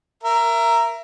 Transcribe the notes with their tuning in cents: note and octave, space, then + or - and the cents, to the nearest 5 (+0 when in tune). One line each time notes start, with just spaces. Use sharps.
A#4 +0 E5 +25